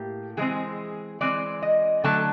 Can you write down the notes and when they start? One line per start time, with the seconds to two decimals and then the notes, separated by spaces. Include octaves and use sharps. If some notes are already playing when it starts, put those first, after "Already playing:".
Already playing: A2 A#3 G4
0.37 E3 G#3 C4 G#4
1.21 E3 G#3 C4 D5
1.62 D#5
2.04 D3 F#3 A3 A5